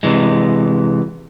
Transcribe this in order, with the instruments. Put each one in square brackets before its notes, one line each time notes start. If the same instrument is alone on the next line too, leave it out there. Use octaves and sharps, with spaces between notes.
[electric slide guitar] C3 E3 G#3